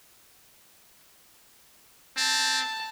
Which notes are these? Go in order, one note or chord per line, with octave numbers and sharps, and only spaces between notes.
C4 A5